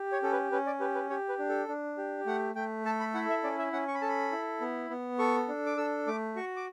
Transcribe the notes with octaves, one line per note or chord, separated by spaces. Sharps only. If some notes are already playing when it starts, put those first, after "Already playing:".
Already playing: G4
C#5
C#4 A4
B4
C#4 B4
D5
G4 B4
B4
G4 C#5
B4
D4
A4
D4
G4
A3 F#5
A3 G5
A4 A5
B5
E4 F#5
E5
C#4 D5
E5
C#4 F#5
C#6
B5
A4 A5
B5
E4
B3
B3
A4 C#6
D4
D6
A4 E6
A3 D6
F#4 C#6
D6